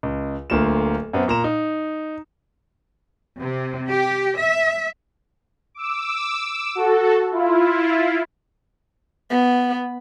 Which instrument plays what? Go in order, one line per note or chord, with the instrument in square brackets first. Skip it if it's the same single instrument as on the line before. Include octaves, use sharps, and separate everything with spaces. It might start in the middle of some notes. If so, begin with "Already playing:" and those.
[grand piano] C#2
D1 D2 A#3 F4 E7
F#2 B3 C4
A#2 A#5 E7
D#4
[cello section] C3
G4
E5
[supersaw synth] D6 E6
F#4 A4
E4 F4
[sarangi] B3